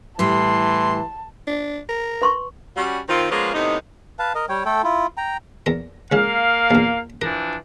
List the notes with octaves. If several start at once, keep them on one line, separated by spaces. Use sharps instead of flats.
A2 E3 G3 A5 C6
D4
A#4
B4 C6 C#6
G3 C#4 F#4
D#3 C4 F4
F3 G#3 A#3 B3 C#4 F4
A2 C3 B3 D#4
B4 F5 A5
A#4 D#5
G3 C#5 G5
A3 A4 G5
E4 F4
G5 A#5
E2 A#4
C#2 C#3 A#3 F5
A#1 E2
E3 F3 D4 A#4